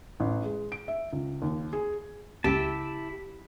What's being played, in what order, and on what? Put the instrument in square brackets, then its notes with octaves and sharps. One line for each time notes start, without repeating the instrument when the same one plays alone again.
[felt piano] A1
G#3
D7
E5
C#2
D#2
G#4
[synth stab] C#2 [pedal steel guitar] E4 E5 A5 [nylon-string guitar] G4